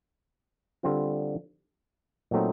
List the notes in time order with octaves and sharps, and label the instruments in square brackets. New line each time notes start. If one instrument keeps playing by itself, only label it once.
[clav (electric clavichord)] D3 G3 C4 F4
A#2 F#3 A3 C4 D#4